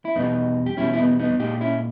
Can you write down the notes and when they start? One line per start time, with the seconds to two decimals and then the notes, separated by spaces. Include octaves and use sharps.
0.05 E4
0.15 E2 B2 G3 B3 D#4
0.66 G4
0.77 E2 B2 G3 C#4 E4
0.93 E4
0.98 B3 D#4
1.19 B3 D#4
1.39 A#2 G#3 D#4 G4
1.61 C#4 E4